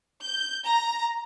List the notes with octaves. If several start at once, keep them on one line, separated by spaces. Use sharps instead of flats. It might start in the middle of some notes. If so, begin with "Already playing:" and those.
G6
A#5